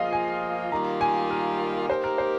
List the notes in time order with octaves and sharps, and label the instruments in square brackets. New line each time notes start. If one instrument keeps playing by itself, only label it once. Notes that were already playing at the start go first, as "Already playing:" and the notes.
Already playing: [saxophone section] F3 A#3 F4 G#4 [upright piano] D#5 F5
[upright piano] G#5
[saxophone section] D#3 G3 A#3 F4 [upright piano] A#5
[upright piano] G#5
A#4
[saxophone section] A#3 D#4 G4 [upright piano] C5
[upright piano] A#4
C5